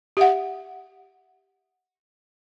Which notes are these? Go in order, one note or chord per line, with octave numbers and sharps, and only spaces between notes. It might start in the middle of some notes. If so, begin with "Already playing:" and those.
G4 E5 F#5